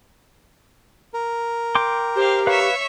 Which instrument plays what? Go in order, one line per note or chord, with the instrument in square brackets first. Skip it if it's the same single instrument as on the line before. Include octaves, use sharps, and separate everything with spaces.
[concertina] A#4
[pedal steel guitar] G5 C6 D6
[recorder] G4 [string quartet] C5 F5
[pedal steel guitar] B4 F5 [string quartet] C#5 E5 C#6